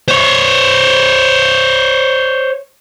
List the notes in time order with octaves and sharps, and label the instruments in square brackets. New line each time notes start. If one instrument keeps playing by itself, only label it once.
[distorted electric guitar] C5 C#5